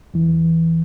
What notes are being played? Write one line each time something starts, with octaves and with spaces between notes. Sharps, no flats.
E2 E3